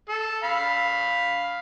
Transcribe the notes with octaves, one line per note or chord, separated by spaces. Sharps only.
A4
F5 B5